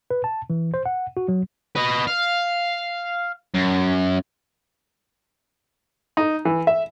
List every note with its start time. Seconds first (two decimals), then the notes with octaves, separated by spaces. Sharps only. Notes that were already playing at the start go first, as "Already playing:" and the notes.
0.11 B4
0.24 A5
0.50 E3
0.74 C5
0.86 F#5
1.17 F#4
1.28 F#3
1.75 B4 D#5
2.07 F5
3.54 F#2
6.17 D#4
6.45 E3
6.67 E5